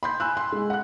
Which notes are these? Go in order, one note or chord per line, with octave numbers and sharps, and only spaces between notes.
B5 C6 G6
G#5 B5 E6 F#6
C6
G#3
F#5 F#6